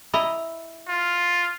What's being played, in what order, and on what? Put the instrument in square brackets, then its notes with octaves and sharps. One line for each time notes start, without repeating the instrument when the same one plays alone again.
[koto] E4 D#5 A#5
[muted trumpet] F4